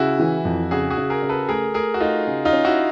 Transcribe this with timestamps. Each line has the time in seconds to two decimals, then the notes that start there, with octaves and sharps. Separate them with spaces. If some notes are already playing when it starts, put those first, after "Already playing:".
Already playing: C#3 E4 F#4
0.19 E3
0.45 F2
0.71 C#3 F#4 G#4
0.90 F#4 G#4
0.97 C#3
1.10 G#4 A#4
1.23 C#3
1.29 A4 B4
1.49 A3 G#4 A#4
1.74 A3 G#4 A#4
1.94 F#4
2.00 A3 D#4 F4
2.27 C#3
2.45 D#4 F4
2.53 C#4
2.65 E4 F#4